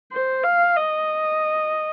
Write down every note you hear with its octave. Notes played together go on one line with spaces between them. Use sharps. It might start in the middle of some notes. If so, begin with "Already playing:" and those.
C5
F5
D#5